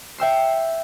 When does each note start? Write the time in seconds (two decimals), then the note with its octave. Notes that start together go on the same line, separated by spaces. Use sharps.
0.18 E5 G5 E6 C7